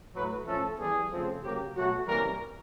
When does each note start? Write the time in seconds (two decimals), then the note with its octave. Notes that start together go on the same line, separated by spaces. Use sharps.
0.13 A2 F#3 A3 B4
0.45 A2 F3 A3 C#4 A4
0.78 E3 G3 B3 G#4
1.10 C#3 F3 A3 C4
1.42 C#3 F#3 A#3 G4
1.76 B2 F#3 A3 F#4
2.07 C3 E3 G3 A#3 C#4 A#4